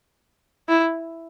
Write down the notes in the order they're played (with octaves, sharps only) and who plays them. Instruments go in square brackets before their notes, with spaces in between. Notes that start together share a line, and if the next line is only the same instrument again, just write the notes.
[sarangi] E4